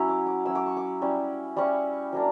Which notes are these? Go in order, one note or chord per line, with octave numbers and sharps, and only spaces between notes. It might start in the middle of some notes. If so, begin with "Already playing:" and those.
Already playing: F#3 C#4 E4
D6
D6
F#3 C#4 E4 E6
D6
C#6
D6
G3 C#4 E4
G3 C#4 E4 C#6
F#3 A#3 D4